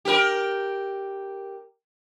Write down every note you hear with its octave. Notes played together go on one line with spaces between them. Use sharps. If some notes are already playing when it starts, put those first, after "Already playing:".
G4 A#4